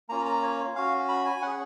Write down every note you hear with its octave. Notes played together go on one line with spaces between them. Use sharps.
A#3 C#4 F4 A#5
A#5
C#5
C#4 F#4 F5
B5
G#5
C#4 G#4 F#5